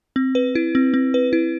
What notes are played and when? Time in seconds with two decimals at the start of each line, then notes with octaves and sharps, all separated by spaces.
0.16 C4
0.35 B4
0.55 E4
0.75 C4
0.94 C4
1.14 B4
1.33 E4